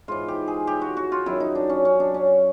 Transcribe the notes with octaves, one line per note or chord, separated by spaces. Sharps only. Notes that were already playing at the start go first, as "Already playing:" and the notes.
G#2 E3 F4
G4
G#4
G4
F#4
F#4
F4
F#2 D#3 F#3 E4
D#4
D4
C#4
C#4
D4
C#4